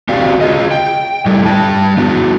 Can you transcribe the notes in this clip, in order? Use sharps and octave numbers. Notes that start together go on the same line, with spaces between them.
C4 F#4 G4 D5 F5
F4 G#4 D#5
G5
G3 A3 E4
G3 G5 A5
B3 D4 F#4